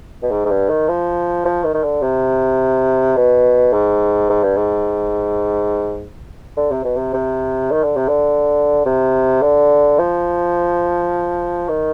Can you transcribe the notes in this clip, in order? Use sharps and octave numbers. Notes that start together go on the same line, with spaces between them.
B2
G#2
G#2
G2
D#3
F3
F3
D#3
D#3
D3
C3
B2
G#2
G#2
G2
G#2
D3
C3
B2
C3
C3
D#3
D3
C3
D3
C3
D3
F3
D#3